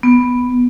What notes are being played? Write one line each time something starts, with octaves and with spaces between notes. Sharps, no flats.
B3